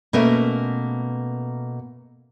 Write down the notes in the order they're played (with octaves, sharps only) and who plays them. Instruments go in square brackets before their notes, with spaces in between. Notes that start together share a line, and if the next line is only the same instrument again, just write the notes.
[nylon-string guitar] B2 A3 A#3 C#4 A#4 E5